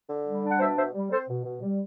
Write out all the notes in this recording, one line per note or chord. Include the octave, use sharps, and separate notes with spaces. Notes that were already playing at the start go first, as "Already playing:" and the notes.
D3
G3
D4
F#5
B2 C5 E5
B2 C5 E5
G3
C4 A4 C5
B2
B2
G3